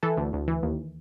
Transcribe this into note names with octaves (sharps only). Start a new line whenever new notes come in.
E3 A4
D2
D2
E3
D#2